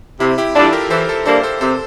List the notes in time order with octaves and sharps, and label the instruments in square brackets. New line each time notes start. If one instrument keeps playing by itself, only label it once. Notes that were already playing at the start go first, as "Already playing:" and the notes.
[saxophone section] C3 [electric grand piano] E4
[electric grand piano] E4 G4
[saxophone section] E3 G3 D4 [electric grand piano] F4 A4
[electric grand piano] G4 A#4
[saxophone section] E3 [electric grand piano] A4 C5
[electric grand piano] A4 C5
[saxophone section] G3 A#3 D4 [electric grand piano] A4 C5
[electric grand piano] A4 C5
[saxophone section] C3 [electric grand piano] A4 C5